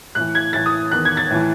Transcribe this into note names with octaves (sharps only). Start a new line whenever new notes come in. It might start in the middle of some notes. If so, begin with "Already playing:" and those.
A2 E3 F#6
G#6
A2 E3 A6
D#6
E2 D#3 F#6
G#6
A6
A2 E3